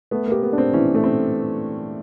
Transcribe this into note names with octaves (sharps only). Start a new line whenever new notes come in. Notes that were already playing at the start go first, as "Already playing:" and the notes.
A3 B3
A#3 G4
B3
D4
C4
E3 C#4
A3
C4